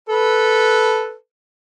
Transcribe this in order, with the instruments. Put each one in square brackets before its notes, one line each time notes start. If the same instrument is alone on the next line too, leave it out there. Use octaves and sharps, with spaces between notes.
[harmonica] A4 B4